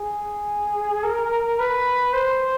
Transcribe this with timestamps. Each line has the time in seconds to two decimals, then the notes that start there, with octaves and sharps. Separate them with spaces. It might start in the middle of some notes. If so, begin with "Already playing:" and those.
Already playing: G#4
1.04 A#4
1.59 B4
2.13 C5